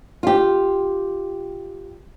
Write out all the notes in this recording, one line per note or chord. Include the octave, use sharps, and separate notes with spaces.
F4 G4